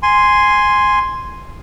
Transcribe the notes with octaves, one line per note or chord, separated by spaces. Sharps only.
G#5 C6